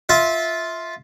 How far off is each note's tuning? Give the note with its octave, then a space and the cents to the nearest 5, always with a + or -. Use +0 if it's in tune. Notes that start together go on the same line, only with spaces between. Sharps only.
F4 +0 E5 -15